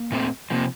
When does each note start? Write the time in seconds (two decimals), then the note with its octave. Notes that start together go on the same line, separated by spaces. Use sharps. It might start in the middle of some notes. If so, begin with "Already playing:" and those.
Already playing: A#3
0.12 A#2 A3 C4
0.50 C3 F3 A#3